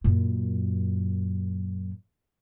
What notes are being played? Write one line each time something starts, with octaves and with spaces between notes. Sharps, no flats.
F#2 A#2